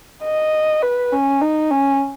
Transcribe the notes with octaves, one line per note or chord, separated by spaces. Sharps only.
D#5
B4
C#4
D#4
C#4